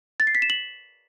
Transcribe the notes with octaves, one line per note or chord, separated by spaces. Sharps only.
A6
C7
B6
E7
F#7